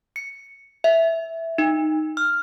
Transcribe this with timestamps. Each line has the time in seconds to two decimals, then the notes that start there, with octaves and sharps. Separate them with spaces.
0.16 C#7
0.84 E5
1.58 D#4
2.17 F6